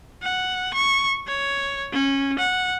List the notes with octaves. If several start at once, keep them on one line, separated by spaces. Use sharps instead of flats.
F#5
C#6
C#5
C#4
F#5